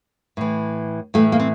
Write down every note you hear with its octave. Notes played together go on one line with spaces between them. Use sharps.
A2 E3
A2 E3 A3
A#3
C4